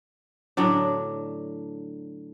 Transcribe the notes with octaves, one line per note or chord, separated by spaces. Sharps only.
A2 D3 F#3 D4